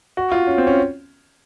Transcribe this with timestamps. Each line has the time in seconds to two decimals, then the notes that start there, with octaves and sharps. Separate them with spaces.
0.17 F#4
0.32 F4
0.47 C#4
0.58 C4
0.67 C#4